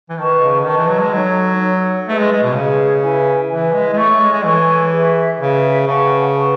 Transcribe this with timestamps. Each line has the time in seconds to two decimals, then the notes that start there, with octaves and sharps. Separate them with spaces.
0.09 E3
0.18 D#3 B4 D#5 A5 C#6
0.42 C#3
0.65 D#3 B4 D#5 A5 C#6
0.77 E3
0.89 F#3
1.01 G#3
1.13 F#3 D#4 A4 C#5
1.60 D#4 A4 C#5
2.08 A3 G#4 B4 D#5
2.19 G#3
2.31 G#3
2.43 B2
2.55 C#3 G#4 B4 D#5
3.02 E4 B4 E5 G#5
3.50 E3 E4 B4 E5 G#5
3.73 G#3
3.93 G#3
3.97 A3 A4 C#5 G#5 C#6
4.09 A3
4.21 G#3
4.33 G#3
4.45 E3 A4 C#5 G#5 C#6
4.92 G#4 B4 E5
5.39 C#3 G#4 B4 E5
5.87 C#3 B4 F#5 A5 C#6
6.34 B4 F#5 A5 C#6